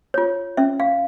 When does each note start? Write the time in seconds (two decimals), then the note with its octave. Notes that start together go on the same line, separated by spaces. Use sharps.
0.14 F4 C#5
0.57 C#4 E5
0.80 F5